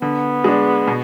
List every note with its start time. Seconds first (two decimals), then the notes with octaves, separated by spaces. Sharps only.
0.02 D3 B3
0.44 G#3 D4
0.88 B2